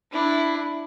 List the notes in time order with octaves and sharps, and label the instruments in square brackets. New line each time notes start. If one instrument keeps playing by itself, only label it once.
[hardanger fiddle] D4 E4